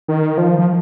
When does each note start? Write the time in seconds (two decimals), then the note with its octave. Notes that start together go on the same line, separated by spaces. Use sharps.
0.08 D#3
0.38 F3
0.58 F3